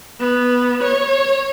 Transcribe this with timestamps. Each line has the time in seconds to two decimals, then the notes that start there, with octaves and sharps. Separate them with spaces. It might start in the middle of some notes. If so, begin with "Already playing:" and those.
0.20 B3
0.83 C#5